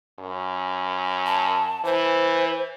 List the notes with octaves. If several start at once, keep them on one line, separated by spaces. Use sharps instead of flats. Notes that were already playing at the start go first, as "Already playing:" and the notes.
F#2
A5
E3 C5